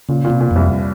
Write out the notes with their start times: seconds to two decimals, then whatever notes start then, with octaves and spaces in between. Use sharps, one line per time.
0.09 A#2 C#3
0.24 A#2
0.30 C3
0.40 A#2
0.51 F2
0.56 C2